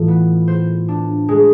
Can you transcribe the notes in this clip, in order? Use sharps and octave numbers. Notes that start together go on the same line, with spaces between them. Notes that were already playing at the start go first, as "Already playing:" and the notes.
Already playing: A2 E3 F4
B3
C5
D4
G#3